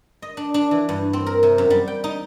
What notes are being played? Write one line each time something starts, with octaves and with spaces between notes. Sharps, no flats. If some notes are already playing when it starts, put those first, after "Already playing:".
D#5
D4
D4
E3
G2
C4
A#4
C3
F#2
G3
G5
D#4